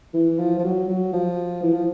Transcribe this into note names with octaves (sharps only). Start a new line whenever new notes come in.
E3
F3
F3
F#3
F#3
F3
E3
F3